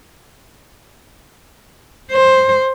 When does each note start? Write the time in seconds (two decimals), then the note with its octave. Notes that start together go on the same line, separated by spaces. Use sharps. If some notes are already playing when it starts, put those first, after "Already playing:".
2.11 C5